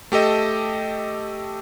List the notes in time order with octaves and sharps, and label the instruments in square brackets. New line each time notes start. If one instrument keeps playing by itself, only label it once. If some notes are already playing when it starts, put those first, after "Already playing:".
[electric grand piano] A3 G4 A4 D#5